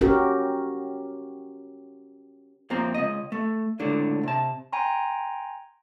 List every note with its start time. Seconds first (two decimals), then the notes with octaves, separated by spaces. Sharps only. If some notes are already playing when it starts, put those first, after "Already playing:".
0.01 C#4 F#4 G4 A#4
2.70 F2 F3 A#3 C4 A#5
2.94 C#2 D#5
3.32 A3
3.79 C#2 A2 D3 D4
4.23 C3 A5
4.73 G5 G#5 A#5 C6